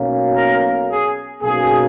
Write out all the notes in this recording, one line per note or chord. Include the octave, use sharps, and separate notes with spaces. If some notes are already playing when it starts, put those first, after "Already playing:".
Already playing: B1 B2 A#3 C#4
A#4
G#4
B1 B2 A#3 C#4 G#4